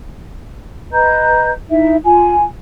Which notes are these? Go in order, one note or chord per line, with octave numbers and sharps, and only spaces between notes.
B4 D#5 A#5 G6
D#4 E4 E5
F4 G#5